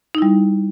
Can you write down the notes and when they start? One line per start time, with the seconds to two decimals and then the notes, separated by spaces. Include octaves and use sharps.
0.15 D#4
0.18 E4
0.22 G3